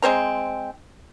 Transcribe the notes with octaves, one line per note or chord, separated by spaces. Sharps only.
G#3 C4 C5 A#5